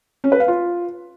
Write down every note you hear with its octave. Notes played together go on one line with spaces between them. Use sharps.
C#4
B4
F5
F4